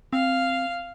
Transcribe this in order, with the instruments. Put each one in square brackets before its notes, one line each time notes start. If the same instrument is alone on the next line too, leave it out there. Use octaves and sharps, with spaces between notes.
[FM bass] C4 [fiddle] F5